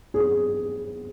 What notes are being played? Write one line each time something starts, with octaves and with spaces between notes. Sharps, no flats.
G#4